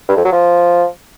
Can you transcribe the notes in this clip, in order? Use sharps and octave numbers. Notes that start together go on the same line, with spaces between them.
G2
F2
F#3
F3